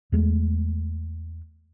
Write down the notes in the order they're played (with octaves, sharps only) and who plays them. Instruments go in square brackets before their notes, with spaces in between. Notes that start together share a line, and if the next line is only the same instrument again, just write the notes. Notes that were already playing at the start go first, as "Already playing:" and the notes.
[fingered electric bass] E2 G#3 A3